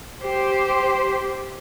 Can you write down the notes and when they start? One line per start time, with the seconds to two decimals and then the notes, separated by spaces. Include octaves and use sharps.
0.22 G4 C5